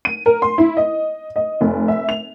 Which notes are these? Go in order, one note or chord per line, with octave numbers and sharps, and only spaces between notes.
D#7
A#4
C6
E4
D#5
D#5
F1
E5
F7